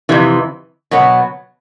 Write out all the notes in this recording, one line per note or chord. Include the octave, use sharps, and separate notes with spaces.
F2 C3 E3
B2 F#3 B3